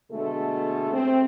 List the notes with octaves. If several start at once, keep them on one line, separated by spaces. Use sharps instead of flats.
B2 D3 G#3 A3 A4
C4